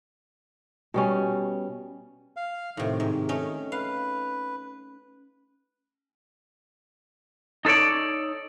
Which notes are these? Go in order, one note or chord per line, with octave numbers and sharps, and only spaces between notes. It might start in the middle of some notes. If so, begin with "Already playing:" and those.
B2 G3 C#4
F5
A2 C3 D#3
G#2
A3 C#4 D#4
B4 F5
D#4 A4 B4 C#5 D5